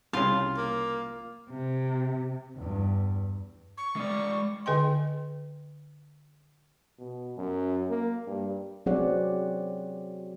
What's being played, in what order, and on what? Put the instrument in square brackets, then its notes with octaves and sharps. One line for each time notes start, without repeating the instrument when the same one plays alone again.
[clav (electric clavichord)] C2 C#3 [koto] F4 F5
[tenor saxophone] A#3
[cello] C3
[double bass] E2 G2
[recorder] C#6
[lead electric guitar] G#3 D5
[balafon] D3 B4 D#5 G5 C6
[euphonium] B2
F#2
A#3
G2
[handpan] F#3 C4 G#4 C#5 D5 F#5